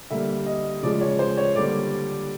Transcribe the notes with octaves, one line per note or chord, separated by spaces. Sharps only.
D3 G3 A#3 E5
D#5
C#3 F3 G#3 D5
C#5
C5
C#5
D3 G3 A#3 D5